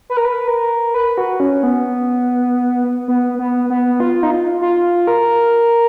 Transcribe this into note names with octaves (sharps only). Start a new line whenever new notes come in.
B4
A#4
B4
A#4
B4
F#4
C#4
B3
B3
B3
B3
F4
D#4
F4
F4
A#4